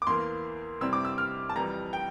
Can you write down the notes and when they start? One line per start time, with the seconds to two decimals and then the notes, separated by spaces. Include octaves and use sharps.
0.02 D6
0.07 E2 E3 A#3 C6
0.81 C3 G3 C4 E4 E6
0.93 D6
1.05 E6
1.18 F6
1.49 A5
1.56 F2 E3 G3 A#5
1.93 G5